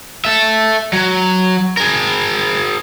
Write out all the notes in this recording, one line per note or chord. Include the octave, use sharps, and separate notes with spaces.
A4 E5
F#3
G#4 A#4